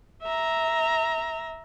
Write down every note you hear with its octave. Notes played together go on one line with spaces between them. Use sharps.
E5 A#5